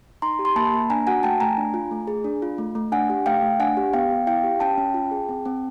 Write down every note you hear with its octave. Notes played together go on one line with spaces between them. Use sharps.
D#4 A#5 C6
G4
C6
A#3 A5 B5
A#3
D4 G#5 A#5
F#4 F#5 G#5
A3 G5 A5
A3 G#5 A#5
D4
F4
A3
G#4
D4
F4
A3
A3
D4 F#5 G#5
G4
A3 F5 G5
A3
D4 F#5 G#5
G4
B3 F5 G5
B3
E4 F5 G5
G4
C#4 G5 A5
C#4
F4
G#4
C4
C4